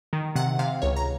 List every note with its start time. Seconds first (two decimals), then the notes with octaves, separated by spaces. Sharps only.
0.13 D#3
0.36 C3 F#5
0.59 C3 F5
0.82 C#2 C#5
0.97 A#5